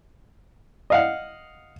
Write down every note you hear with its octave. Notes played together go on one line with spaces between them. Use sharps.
D#5 F5 F#5